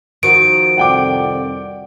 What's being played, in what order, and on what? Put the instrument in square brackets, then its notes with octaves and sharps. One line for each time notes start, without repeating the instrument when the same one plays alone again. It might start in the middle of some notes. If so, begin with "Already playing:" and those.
[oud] D#3 F3 F#4 [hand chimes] D7
[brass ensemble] C2 F2 D5 [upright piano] F#5 G5 D6